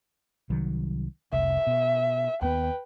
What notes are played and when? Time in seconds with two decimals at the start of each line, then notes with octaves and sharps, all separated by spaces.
0.50 C2 D#3 F#3
1.33 F1 C2 E5
1.67 B2
2.42 D#2 B3 B4 G5